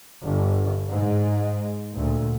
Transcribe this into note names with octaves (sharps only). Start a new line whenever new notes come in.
G1
G#2
D2 A#2